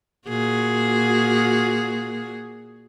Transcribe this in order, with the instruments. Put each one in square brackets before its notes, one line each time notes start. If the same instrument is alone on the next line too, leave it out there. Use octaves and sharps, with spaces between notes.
[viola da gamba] A#2 F#4 G#4